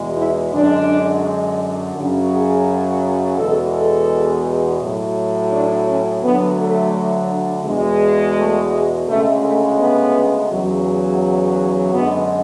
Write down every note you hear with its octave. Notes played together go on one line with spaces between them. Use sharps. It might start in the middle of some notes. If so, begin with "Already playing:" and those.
Already playing: E2 B2 G#3
E4
F#2 D3 G#3 D4
F#2 C#3 F#3
G#4
E2 B2 G#3 A4
A4
A2 F#3
D4
C#4
D2 D3 F#3 B3
A3
E2 B2 G#3
A3
G#3
D2 C#3 G#3 A3
A3
B3
E2 C#3 F#3
F#2 D3 G#3 B3